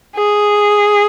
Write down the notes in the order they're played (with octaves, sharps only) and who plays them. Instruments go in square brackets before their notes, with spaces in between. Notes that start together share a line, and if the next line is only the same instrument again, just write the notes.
[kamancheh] G#4